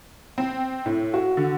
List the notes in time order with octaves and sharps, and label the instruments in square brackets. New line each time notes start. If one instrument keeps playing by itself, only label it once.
[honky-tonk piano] C4
A2
[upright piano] F#4
[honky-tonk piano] D3